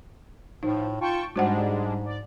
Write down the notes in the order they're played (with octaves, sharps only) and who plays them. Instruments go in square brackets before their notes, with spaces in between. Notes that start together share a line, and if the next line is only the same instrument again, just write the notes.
[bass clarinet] A2 [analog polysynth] F3 [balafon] D#4
[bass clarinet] F4 [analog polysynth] G5 A5 C#6
[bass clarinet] G#2 [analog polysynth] G3 G#3 D4 [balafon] F#4 C5 F#5
[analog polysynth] D5